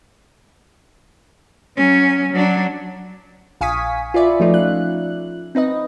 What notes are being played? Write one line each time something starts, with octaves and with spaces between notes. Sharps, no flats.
F#3 C#4
F#3 D4
A#1 F5 G#5 C#6 D#6 B6
F4 B4 D5 E5
F3 A3 C#4 D#4 F4
F#6
C4 D#4 B4 D#5